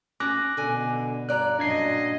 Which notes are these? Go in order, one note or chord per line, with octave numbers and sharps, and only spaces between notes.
C#4 D6 F#6 A#6
B2 D3 G#5
G2 D5 A#5 F#6
F#2 A#2 D4 D#5 G#6 C7